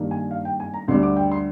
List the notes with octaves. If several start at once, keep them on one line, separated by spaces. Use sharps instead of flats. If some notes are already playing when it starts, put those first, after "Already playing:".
Already playing: G2 D#3 A#3 D4
G#5
F5
G5
G#5
A#5
D2 D3 G3 D4 C6
D6
G5
C6